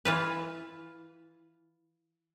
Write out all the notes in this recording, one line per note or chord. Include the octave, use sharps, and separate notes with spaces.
E3 F4 B4